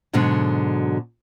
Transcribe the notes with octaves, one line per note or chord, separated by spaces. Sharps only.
G#2 B2 D3 F#3 G#3 G#4